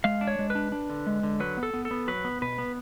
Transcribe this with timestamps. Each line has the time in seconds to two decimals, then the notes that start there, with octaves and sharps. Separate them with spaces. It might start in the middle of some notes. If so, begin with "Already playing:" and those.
0.04 G#3 F5
0.21 D4
0.27 C#5
0.39 G#3
0.50 B4
0.55 D4
0.72 D4
0.90 D3
1.07 G#3
1.23 D3
1.40 F#3 B4
1.57 B3
1.63 A4
1.74 B3
1.85 A4
1.91 B3
2.08 F#3 B4
2.25 B3
2.42 B2 B4
2.58 B3